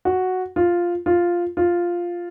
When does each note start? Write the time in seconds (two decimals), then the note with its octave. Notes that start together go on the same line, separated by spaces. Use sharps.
0.05 F#4
0.56 F4
1.06 F4
1.57 F4